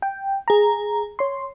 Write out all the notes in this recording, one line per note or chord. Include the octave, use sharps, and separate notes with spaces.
G5
G#4 A#5
C#5 C6